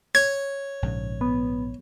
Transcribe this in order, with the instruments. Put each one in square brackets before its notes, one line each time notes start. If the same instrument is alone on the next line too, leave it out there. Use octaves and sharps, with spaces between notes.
[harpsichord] C#5 [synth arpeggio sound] G#6
[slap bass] A#1 G#2 C#3
[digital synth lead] B3